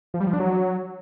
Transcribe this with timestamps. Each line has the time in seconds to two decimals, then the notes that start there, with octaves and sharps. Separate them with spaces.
0.14 F3
0.20 G3
0.27 F3
0.33 D4
0.40 F#3